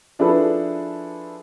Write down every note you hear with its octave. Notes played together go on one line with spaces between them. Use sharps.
F3 D4 E4 G#4 A4 B4